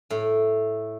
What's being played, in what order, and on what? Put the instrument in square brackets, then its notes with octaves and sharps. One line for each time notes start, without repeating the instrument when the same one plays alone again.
[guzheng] A2